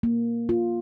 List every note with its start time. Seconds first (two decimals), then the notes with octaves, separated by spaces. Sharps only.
0.03 A#3
0.49 F4